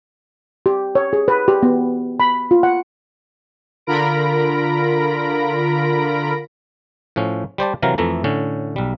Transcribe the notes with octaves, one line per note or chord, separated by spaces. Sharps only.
G4
C#5
G#4
B4
G4
B3
B5
F4
F#5
D3 F4 A#4 B5 A#6 D7
A2 F3 C#4
G3 C5 D5 A5
C3 E3 F#3 A#4 F5 A#5
F2 E3 A3 A#5
A2 D3 C#4
B1 G3